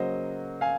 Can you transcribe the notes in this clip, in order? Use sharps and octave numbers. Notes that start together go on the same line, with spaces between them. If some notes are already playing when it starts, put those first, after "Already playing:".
Already playing: C#3 F#3 A#3 C5 D#5
F5 G#5